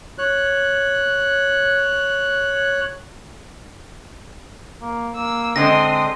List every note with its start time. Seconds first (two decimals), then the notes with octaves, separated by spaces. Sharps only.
0.18 C#5 F#6
4.82 A#3
5.16 A#3 E6
5.56 D3 G#3 C4 D4 C6 D#6 A#6